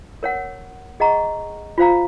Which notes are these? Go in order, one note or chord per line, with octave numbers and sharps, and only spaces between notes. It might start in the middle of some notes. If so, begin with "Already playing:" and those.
A#4 C#5 F#5
G#4 D#5 F#5 A#5 C#6
F4 C5 F5 A#5